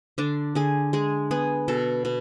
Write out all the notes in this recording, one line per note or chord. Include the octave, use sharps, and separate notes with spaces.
D3 D4
D3 G#4
G#3 G#4
B3 G#4
B2 A4
B2